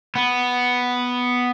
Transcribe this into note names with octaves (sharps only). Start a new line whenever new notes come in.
B3